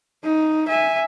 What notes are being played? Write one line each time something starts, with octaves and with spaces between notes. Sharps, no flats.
D#4
E5 G#5